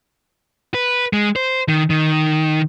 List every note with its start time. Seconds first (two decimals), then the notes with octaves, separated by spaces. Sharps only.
0.74 B4
1.13 G#3
1.36 C5
1.69 D#3
1.90 D#3